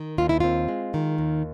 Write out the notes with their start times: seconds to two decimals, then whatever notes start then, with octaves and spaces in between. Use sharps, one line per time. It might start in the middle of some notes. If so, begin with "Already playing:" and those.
Already playing: D#3
0.18 D#2 F4
0.29 E4
0.40 C4 F4
0.68 G#3
0.94 D#3
1.18 D#2